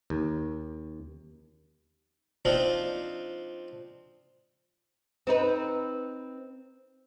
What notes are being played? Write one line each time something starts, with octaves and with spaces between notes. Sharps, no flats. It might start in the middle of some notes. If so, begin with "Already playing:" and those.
D#2
F3 C4 D4 D#4 F4
C4 D#4 B4